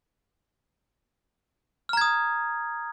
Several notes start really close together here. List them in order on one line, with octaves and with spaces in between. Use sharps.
F6 A#5 G#6 D#6